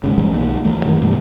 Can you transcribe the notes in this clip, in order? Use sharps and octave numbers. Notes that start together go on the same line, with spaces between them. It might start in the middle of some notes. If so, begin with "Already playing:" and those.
D#2 G#2 C#3
A#1 E3 G3 G#3
B1 D#3 A#3
D2 E3 A3
F#2 D#3 E3
F#2 B2 G3 A3